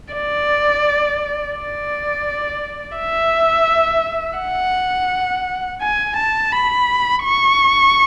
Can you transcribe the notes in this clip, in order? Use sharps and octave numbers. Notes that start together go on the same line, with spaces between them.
D5
D5
E5
F#5
G#5
A5
B5
C#6